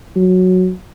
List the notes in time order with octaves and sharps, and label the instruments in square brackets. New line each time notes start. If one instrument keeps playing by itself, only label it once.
[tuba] F#3